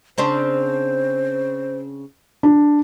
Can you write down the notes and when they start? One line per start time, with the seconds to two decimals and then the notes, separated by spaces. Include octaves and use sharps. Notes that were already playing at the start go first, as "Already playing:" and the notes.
0.18 C#3 C4 D4 C5
2.43 D4